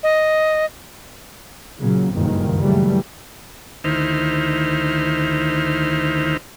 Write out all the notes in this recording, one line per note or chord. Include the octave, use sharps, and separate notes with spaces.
D#5
A#2 C#3 F#3
F#1 C#2 G2 A#2 D#3
C#3 E3 F#3 G3 A3
D2 D#3 D#4 E4 C5 F6